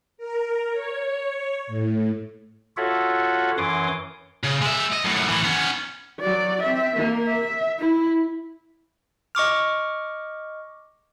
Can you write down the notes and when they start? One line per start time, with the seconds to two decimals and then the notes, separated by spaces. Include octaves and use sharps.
0.18 A#4
0.72 C#5
1.67 A2
2.77 F4 F#4 A4 C#5 E5 F#5
3.58 F#2 E3 C#5 C6 D6 D#6
4.44 C#3
4.62 G#3 E5
4.93 D#5
5.05 F#2 A2
5.28 A2 E3
5.44 B3 C#4
6.20 F#3 D5
6.63 C4 E5
6.96 A#3
7.27 E5
7.80 E4
9.35 D#5 C#6 D6 F6